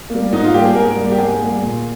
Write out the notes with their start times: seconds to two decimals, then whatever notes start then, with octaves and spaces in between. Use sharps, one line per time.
0.10 A#3
0.15 G3
0.32 G#2 D#4
0.44 F4
0.53 G3 A#3 G4
0.65 G#4
0.75 G#2 A#4
0.96 G3 A#3
1.12 G4
1.18 G#2 G#4
1.40 G3 A#3
1.62 A#2